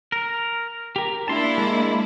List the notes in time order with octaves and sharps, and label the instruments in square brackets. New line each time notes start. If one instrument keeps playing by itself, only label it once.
[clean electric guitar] A#4
G4 A#4
[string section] A#3 D4 E4 [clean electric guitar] A5 C6
[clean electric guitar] G#3